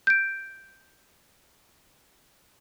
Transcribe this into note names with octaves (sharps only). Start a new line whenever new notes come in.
G6 D7